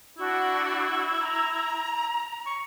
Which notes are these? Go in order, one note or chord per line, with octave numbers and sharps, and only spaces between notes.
D4 E4 F#4
A#5
C#6